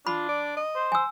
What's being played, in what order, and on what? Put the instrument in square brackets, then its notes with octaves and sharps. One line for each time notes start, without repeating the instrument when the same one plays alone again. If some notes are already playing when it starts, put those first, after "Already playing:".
[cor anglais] D4 [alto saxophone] F4 [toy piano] B5
[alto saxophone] D5
D#5
[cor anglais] C5
[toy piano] G#5 E6